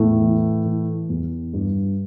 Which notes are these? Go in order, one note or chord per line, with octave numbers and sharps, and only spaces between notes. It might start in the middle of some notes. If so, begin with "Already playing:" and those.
Already playing: E2 A2 A3
E3
E3
E2
G2